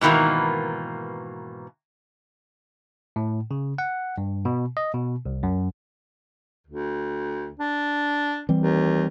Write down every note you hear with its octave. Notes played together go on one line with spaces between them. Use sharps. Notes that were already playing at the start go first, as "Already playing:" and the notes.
G#2 B2 D#3 E3 A#3
A2
C#3
F#5
G2
B2
D#5
B2
C2
F#2
D2
D4
E3 G3 C4
D#2